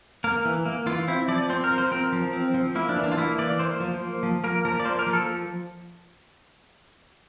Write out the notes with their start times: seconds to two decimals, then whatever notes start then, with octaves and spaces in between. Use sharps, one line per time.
0.24 A#3 A#4
0.45 E3
0.66 A#3
0.86 E3 F4
1.08 C4 E4
1.28 F3 D5
1.50 C4 C5
1.64 A#4
1.71 F3
1.78 C5
1.92 C4 A#4
2.12 F3
2.33 C4
2.54 F3
2.75 A#3 E4
2.89 D4
2.96 E3
3.03 D4
3.11 F4
3.18 A#3 E4
3.38 E3 D5
3.59 A#3 C5
3.80 F3
4.01 A#3
4.23 F3
4.44 A#3 A#4
4.65 F3 A#4
4.80 D5
4.85 A#3 C5
4.99 A#4
5.07 F3
5.13 A4